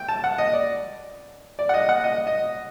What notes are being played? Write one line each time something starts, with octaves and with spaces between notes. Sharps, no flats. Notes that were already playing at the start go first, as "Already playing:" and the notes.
Already playing: G5
A5
F#5
D#5
D5
D5
F#5
D#5
F#5
D#5
D#5